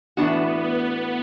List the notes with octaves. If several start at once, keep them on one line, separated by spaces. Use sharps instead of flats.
A2 E3 B3 D4 F#4
B3